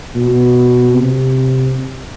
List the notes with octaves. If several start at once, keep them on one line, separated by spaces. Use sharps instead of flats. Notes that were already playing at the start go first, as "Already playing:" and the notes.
B2
C3